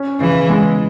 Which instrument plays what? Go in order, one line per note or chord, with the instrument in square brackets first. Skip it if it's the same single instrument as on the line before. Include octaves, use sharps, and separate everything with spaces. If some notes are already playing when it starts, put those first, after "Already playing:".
Already playing: [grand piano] C#4
[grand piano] C#3 [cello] E3
[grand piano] G#3